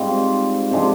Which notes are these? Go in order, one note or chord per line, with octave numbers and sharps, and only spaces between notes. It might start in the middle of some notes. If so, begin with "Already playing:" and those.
Already playing: G#2 G3 C4 F4
C3 F3 G#3 D4